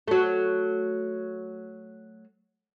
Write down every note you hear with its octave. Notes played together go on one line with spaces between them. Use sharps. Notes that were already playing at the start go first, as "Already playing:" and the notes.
F#3 A3